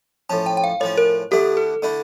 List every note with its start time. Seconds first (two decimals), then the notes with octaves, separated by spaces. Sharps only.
0.30 A2 F3 C#4 A5
0.46 G5
0.57 G5
0.64 F5
0.80 A2 F3 C#4 C#5
0.97 A#4
1.31 D2 D3 A3 E4 G4
1.57 A4
1.82 D3 A3 E4